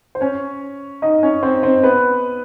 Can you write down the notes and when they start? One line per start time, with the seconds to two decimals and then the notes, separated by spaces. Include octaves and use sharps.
0.15 C5
0.21 C#4 C#5
1.02 D#4 D#5
1.23 C#4 C#5
1.43 C4 C5
1.63 C4 C5
1.83 B3 B4